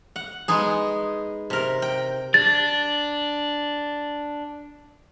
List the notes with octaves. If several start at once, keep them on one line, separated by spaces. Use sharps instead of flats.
F#5
G#3 B3 D#4 G#4
C3 A#4
G5
D4 A6